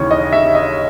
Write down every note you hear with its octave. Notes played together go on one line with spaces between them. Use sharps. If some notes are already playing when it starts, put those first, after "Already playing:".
Already playing: D#2 C#3 E3 C#5
D#5
E5
D#5